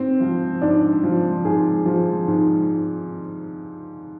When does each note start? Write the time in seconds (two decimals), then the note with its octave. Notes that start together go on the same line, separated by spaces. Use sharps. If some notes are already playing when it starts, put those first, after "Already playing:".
Already playing: G#2 C4
0.20 F3
0.61 G#2 D4
1.04 F3
1.44 G#2 G#4
1.86 F3
2.27 G#2